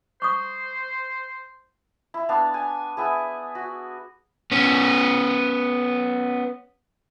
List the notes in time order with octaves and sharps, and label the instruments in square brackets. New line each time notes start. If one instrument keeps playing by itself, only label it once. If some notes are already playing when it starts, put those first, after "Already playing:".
[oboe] C5 [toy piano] C#6 D#6
[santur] E4
B3 D4 F5 A5
G#5
B3 E4 G#4
F#4
[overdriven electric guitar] B3 C#4